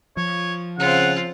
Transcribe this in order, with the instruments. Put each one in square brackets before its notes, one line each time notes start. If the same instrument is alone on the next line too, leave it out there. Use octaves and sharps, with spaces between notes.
[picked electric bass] F3 [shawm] C#5
[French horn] C#3 [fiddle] C4 F4 [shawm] F#5